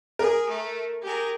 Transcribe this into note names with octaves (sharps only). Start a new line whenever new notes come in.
G#4 A#4
A3
G4 G#4 A#4